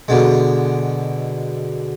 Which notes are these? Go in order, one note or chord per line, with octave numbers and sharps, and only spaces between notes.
B2 D3 G#3